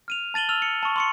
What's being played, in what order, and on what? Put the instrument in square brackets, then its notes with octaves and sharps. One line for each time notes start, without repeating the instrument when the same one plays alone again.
[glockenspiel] F6 D#7 F7
A5 A6 D#7 F#7 G7
E6 F6 F7
C#7
A5 C#6
C6 C#6 C#7